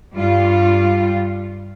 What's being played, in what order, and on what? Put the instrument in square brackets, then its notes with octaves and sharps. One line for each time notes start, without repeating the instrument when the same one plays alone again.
[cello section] G2 G3 F4